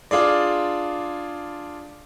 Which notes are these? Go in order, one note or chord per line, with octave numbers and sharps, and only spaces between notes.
D4 F4 G#4 D5